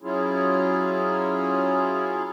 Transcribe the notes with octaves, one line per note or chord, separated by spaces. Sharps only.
F#3 C#4 E4 F4 G#4